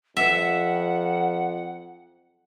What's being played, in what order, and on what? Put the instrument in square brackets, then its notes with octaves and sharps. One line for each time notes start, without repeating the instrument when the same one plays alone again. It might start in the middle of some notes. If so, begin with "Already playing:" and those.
[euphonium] F2 [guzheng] E5 [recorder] F#5